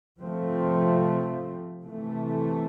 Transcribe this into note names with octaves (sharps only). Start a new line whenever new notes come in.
C3 F3 A3 C4
C3 E3 A3